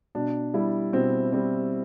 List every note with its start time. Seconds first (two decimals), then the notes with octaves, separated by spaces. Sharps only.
0.15 B2 D4
0.54 G3 E4
0.93 B2 C4
1.33 G3 C4